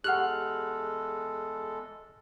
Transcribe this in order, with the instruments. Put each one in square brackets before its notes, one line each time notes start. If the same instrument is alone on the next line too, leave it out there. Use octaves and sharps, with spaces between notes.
[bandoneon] E2 G#3 A4 [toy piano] G4 F#5 [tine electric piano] F6 F#6